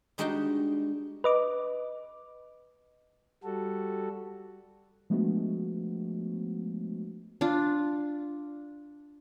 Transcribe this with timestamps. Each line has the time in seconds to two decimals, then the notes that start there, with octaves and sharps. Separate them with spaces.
0.18 G3 G#3 D4 D#4 F#4 G5
1.24 B4 D#5 D6
3.44 G3 F#4 A4
5.10 F3 G#3 A3 B3 D4 F#4
7.41 D4 F4